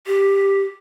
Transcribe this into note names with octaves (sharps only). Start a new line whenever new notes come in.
G4